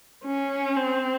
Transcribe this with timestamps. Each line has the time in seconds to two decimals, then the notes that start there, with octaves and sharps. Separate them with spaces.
0.24 C#4
0.76 C4